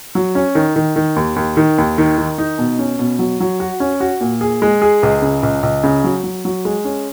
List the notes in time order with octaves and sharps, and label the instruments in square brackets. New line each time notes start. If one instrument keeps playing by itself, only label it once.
[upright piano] F#3
C#4
D#3
D#3
D#3
D#2
D#2
D#3
D#2
D#3
D#3
D#4
B2
C#4
B2
F#3
F#3
F#4
C#4
F#4
A#2
G#4
G#3
G#4
C#2
C#3
C#2
C#2
C#3
F#3
F#3
F#3
G#3
C#4